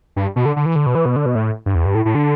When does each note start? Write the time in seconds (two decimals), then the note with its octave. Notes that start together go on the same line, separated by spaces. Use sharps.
0.16 G2
0.36 B2
0.46 D3
0.56 D3
0.66 E3
0.76 D3
0.86 B2
0.95 E3
1.06 B2
1.16 D3
1.26 B2
1.35 A2
1.66 G2
1.75 E2
1.86 G2
1.95 A2
2.05 A2
2.15 D3